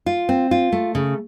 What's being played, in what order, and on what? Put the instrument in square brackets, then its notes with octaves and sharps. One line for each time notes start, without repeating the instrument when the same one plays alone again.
[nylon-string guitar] F4
C4
F4
A3
C#3